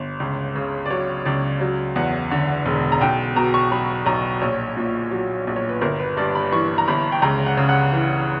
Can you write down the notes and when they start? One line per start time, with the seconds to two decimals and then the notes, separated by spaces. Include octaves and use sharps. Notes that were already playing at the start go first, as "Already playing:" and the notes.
Already playing: G1
0.20 C#2
0.55 C#3
0.86 D5
0.90 F#3 C#5
1.25 C#2 D5
1.61 F#3
1.96 E2 F#5
2.31 D3
2.66 E1
2.92 A#5
3.01 B1 G5
3.36 B2 A#5
3.54 C#6
3.72 F#3 B5
4.06 B1 A#5
4.42 A#1 C#5
4.77 A#2
5.11 F#3
5.47 A#1
5.56 C#5
5.69 B4
5.81 G1 A#4
6.00 B4
6.17 G2 D5
6.35 B5
6.52 E3 C#6
6.78 A#5
6.88 G1 B5
7.12 G5
7.22 C#2 A#5
7.46 F#5
7.57 C#3
7.69 F#5
7.93 E3